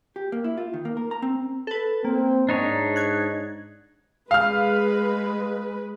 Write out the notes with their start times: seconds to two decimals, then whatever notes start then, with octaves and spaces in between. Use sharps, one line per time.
0.16 G4
0.32 A#3
0.44 E4
0.58 F4
0.74 D#3
0.85 A#3
0.97 A#4
1.11 A#5
1.22 C4
1.67 A4 B4
2.05 A#3 C4
2.49 G#2 D4 D#4 C#5
2.96 F#6 G#6
4.31 G#3 B4 F5 F6